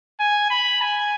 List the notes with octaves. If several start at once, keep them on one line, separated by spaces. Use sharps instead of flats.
G#5
B5
G#5